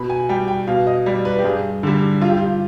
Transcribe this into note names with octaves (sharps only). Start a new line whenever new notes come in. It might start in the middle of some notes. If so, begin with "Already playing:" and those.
Already playing: B2 B5
G#5
G3 G5
G5
B2 F5
D#5
G3 D5
B4
G4
G2 G#4
D3 G3
G2 F4
G4
F4